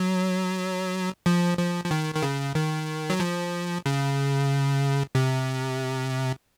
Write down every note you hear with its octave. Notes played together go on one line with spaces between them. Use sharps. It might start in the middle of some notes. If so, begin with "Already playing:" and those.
Already playing: F#3
F3
F3
F3
D#3
D#3
C#3
D#3
F#3
F3
C#3
C3